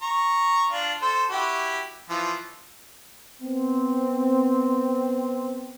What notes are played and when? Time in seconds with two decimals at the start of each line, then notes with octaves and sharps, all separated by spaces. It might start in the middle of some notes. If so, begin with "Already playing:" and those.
0.02 A#5 C#6
0.71 D4 F4
1.02 A4 C5
1.30 E4 F#4 G4
2.10 E3 F3
3.42 B3 C4